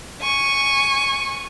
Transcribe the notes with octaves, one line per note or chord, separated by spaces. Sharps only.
G#5 C#6